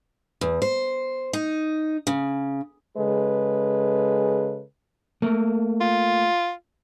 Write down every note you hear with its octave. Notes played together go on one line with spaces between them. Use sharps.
E2
C5
D#4
C#3
C#3 G#3 A4 B4
A3 A#3
F4